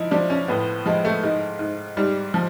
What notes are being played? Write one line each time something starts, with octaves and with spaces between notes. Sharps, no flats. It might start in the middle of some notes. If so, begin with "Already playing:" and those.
Already playing: F3 D#4 E4
F3 D4
C#4
A2 B3
F3 G#3
A3
G#2 G#3
G#2
G#2 G3
F3